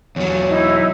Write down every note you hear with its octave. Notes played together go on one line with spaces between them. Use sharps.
E2 F#3 C#5
D#4 E4